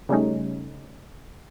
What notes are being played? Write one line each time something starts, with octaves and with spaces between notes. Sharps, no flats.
C#3 G3 A3 C#4 D#4